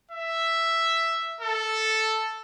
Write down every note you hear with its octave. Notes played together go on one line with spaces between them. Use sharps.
E5
A4